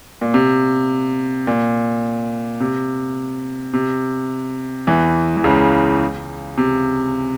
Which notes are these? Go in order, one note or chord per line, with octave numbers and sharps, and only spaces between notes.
A#2
C3
A#2
C3
C3
E2 E3
E3
C#2 C#3
C3